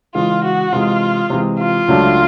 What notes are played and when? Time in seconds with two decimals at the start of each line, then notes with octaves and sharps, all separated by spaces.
0.15 C#3 E3 G#3 F4
0.44 F#4
0.72 C3 E3 G#3 F4
1.30 C3 E3 G#3
1.59 F4
1.88 C#2 C#3 F#3 A3 D4